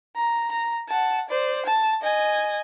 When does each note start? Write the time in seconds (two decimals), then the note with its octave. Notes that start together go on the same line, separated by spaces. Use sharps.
0.16 A#5
0.52 A#5
0.89 F#5 A5
1.29 C5 D5
1.65 A5
2.03 D#5 G#5